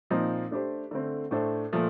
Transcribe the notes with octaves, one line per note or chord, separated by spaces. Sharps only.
A#2 F3 C4 D#4
A3 D4 G4 C5
D3 A3 C4
A2 A3 D4 A4 C5
A#2 F3 A3